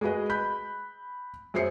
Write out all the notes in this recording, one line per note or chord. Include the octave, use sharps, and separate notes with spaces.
G#3 F#4 G#4 B4 D#5
B5 F#6 G6 B6
F#2 G#4 C5 E5 C7 C#7